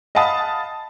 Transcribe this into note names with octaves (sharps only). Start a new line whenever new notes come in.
D#5 F5 F#5 A5 B5 D#6